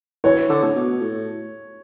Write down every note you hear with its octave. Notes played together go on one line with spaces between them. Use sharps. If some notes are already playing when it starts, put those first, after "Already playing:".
E3 C#5
D3
A2
B2
A2